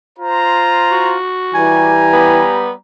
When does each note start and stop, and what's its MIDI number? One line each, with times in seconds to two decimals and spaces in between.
0.19 1.17 65
0.19 1.17 72
0.19 1.17 82
0.92 1.89 66
1.54 2.42 52
1.54 2.77 55
1.54 2.77 67
1.54 2.60 80
1.54 2.77 82
2.14 2.71 59